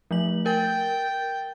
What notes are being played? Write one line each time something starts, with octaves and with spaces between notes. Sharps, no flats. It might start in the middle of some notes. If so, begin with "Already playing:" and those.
F3 A3 F#7
A#4 G5 A6